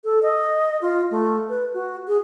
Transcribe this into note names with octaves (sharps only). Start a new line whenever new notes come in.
A4
D#5
F4
A3
B4
F#4
G#4